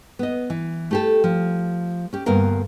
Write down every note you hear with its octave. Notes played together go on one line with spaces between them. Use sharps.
B3 D#5
E3
A3 G4 A4
F3
C#4 G4
D2 G2 A#3 B3 A#4 F5